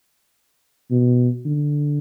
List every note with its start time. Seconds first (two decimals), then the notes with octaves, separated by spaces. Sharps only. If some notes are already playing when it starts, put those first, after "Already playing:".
0.91 B2
1.46 D3